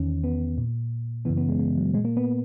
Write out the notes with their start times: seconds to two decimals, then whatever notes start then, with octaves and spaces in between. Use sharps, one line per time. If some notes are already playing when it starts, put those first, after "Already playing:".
Already playing: E2 D#3 C#4
0.24 B3
0.58 A#2
1.25 F#2 C#3 E3 B3
1.37 B3
1.49 G#3
1.59 G#3
1.77 F#3
1.94 A#2 G#3
2.05 A#3
2.17 B3